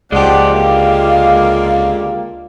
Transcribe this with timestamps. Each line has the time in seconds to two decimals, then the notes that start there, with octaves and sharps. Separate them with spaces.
0.12 C#2 F3 G#3 G4 D5 F#5
0.54 D3 A#3 F4 D5